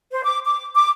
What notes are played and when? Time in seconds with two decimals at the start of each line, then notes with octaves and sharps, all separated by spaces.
0.11 C5
0.24 D6
0.46 D6
0.75 D6